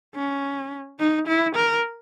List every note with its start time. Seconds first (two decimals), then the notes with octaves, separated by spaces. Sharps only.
0.15 C#4
0.99 D#4
1.27 E4
1.56 A#4